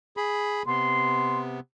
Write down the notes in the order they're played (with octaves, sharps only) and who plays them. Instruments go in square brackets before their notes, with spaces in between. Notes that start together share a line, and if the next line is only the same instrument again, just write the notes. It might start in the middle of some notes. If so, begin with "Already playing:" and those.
[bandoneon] G#4 B5
[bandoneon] C3 B3 [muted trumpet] C6